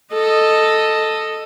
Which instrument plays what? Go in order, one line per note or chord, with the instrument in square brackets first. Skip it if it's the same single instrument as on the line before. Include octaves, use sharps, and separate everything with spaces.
[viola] A4 D#5